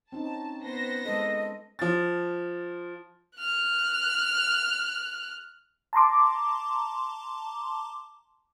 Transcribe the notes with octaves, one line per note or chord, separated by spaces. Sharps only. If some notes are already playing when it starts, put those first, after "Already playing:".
C4 C#4 D#4 A5
B3 C5 A#6
G#3 A4 D#5
F3 A6
F6 F#6
A5 A#5 C6 D6